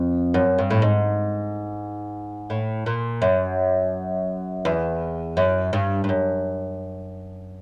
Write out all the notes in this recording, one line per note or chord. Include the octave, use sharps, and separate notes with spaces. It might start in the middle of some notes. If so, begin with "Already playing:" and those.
Already playing: F2
F#2
G2
A2
G#2
A2
A#2
F#2
E2
F#2
G2
G2
F#2